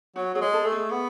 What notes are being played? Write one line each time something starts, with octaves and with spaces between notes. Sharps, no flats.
F#3 F#4
F#3 G#4
G#3
A4
A3
G#4
B3